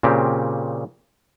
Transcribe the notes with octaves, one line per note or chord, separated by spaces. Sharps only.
A#2 C#3 C4 G4